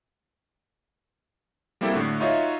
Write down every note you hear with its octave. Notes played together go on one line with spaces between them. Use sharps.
G3 A#3 C4 E4 G4 A4
A2 D3 A3 F#4
D#4 F4 F#4 C#5 D#5 E5